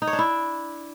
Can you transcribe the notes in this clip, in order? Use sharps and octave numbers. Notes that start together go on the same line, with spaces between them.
D#4
C#5
D4
E4